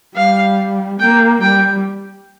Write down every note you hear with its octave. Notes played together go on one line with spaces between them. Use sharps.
G3 F5
A#3 G5
G3 G5